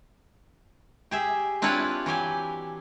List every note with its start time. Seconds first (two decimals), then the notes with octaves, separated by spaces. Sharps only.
1.11 G4 G#4 E5
1.62 C4 D4 E4 F4 B4 C#5
2.06 E3 F#3 G4 G#5